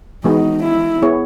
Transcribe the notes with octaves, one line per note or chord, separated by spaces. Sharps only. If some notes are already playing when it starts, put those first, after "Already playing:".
E3 G#3 B3 D#4 F#4
E4
B3 E4 G#4 C#5